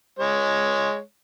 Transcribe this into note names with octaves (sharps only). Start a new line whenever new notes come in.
G#3 C#5